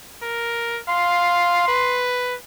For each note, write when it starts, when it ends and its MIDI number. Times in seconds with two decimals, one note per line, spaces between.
0.23 0.80 70
0.89 1.67 77
0.89 2.03 84
1.68 2.35 71